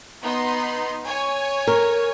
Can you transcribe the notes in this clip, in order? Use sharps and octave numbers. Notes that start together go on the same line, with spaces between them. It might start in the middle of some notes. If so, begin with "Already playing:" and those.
B3 D#4 C6
C#5 G#5
A#4